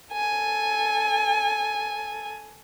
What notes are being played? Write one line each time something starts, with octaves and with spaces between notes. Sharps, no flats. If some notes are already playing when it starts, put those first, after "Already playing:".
A4 G#5